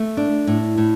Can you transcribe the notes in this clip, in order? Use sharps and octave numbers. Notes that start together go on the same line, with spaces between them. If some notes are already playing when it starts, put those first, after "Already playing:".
Already playing: A3
D4
A2
A2